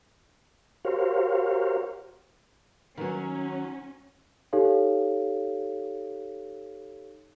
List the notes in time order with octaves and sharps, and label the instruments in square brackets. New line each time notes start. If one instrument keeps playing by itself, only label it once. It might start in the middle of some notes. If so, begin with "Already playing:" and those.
[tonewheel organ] F#4 G4 A#4 C5 C#5 F5
[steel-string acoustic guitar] D#3 F#3 [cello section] C#4
[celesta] D#4 G4 A4 C#5 F5